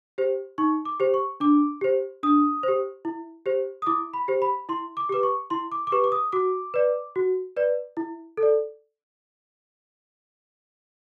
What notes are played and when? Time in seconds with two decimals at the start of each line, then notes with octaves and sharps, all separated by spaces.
0.18 G4 C5
0.58 D#4 C#6
0.85 D6
1.00 G4 C5
1.14 C#6
1.40 D4 D6
1.81 G4 C5
2.23 D4 D#6
2.63 G4 C5
3.05 E4
3.46 G4 C5
3.82 D#6
3.86 E4 D6
4.14 B5
4.28 G4 C5
4.42 B5
4.69 E4 C6
4.97 D6
5.09 G4 B4 D6
5.23 C#6
5.50 E4 C6
5.72 D6
5.87 D6
5.92 G4 B4 C#6
6.04 D6
6.12 D#6
6.32 F#4 D6
6.74 B4 D5
7.16 F#4
7.56 B4 D5
7.97 E4
8.37 A4
8.43 D5